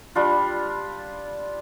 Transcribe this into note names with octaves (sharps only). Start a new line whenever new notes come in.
G3 D4 F4